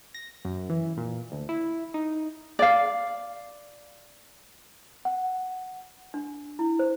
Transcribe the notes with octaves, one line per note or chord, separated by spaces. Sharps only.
A#6
F#2
E3
A#2
D2
E4
D#4
D5 F5
F#5
D4
E4
C5